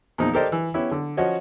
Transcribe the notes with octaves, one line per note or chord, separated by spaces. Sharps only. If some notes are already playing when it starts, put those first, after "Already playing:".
E2 A#2 F3 D#4
G4 A4 A#4 C5 D5 D#5
E3
B3 C#4 E4 G4
D3
F3 C#4 F#4 C#5 D#5